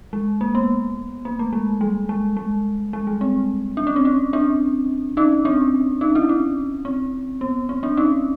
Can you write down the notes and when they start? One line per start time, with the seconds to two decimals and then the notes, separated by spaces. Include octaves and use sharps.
0.13 G#3
0.41 A#3
0.55 B3
1.25 A#3
1.39 A3
1.53 G#3
1.81 G3
2.09 G#3
2.37 G#3
2.93 G#3
3.07 G3
3.21 C4
3.77 D4
3.87 C#4
3.96 C4
4.05 C#4
4.33 C4 D4
5.17 C#4 D#4
5.45 C4 D4
6.01 C#4 D#4
6.15 D4 E4
6.29 C#4
6.85 C4
7.41 B3
7.69 C4
7.83 C4 D4
7.97 C#4 D#4